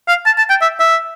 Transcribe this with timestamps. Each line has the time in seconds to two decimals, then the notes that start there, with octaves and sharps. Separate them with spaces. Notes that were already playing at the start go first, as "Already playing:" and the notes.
0.08 F5
0.26 A5
0.38 A5
0.50 G5
0.62 E5
0.80 E5